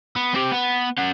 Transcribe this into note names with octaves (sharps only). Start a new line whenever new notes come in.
B3
C4 G4
B3
C#4 F#5